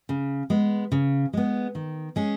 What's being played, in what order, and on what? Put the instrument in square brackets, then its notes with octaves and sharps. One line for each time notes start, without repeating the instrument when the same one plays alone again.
[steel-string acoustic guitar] C#3
G#3 B3
C#3
G#3 B3
D#3
G#3 C#4 G#4